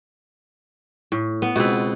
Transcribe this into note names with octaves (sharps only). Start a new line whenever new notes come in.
A2
B3
C#2 B2 C4 B4